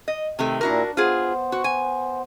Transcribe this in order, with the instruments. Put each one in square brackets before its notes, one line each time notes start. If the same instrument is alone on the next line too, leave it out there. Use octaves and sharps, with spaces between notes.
[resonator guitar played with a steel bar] D#5
[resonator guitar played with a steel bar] C3 D#3 A3 [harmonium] G5
[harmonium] A#2 E4 A#5 [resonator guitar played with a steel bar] D4 F#4 A#4
[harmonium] B3 C5 [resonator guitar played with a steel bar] F4 G#4
[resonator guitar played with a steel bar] F#4
G#5